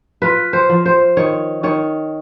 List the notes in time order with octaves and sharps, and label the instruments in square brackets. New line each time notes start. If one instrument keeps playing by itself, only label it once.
[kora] F4 B4
C5
F3
C5
D#3 C#5
D#3 C#5